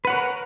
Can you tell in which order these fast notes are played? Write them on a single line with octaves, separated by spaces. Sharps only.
B4 F#5 C#5 A#4